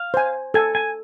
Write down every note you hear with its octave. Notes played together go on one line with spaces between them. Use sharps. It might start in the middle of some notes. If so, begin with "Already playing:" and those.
Already playing: F5
C5 G#5
A4 G#5
G#5